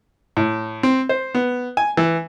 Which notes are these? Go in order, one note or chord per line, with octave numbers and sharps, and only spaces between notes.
A2
C4
C5
B3
G#5
E3